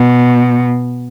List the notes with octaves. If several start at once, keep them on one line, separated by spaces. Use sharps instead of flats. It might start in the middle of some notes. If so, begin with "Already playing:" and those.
Already playing: B2